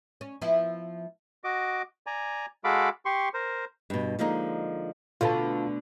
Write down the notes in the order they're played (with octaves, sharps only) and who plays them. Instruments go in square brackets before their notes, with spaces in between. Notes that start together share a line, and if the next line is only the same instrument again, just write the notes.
[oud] C#4
F3 B3 E4
[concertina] F#4 D#5 D6
D5 G#5 A#5
G#3 F#4 A4 F5 B5 D6
G4 C6 C#6
A#4 C5
[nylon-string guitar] G2 B2
D3 F3 G#3 A#3 D#4
[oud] B2 D3 A3 [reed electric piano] F4 F5 A5